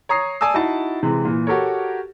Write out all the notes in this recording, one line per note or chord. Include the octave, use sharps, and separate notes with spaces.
C#5 A#5 D#6 C7
D5 G#5 A5 D#6 E6
D#4 E4 F#4 A5
C3 E3 G#3
A#2 E3
F#4 G4 A4 A#4 C#5